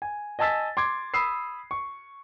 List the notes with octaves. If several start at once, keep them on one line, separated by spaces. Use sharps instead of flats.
G#5
D#5 G#5 A5 E6 A6 B6
C6 D6 G#6
B5 D#6 E6 C7
C#6